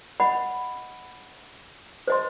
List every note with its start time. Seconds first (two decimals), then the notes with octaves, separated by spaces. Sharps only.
0.20 D#5 F#5 B5
2.08 C5 D#5 C6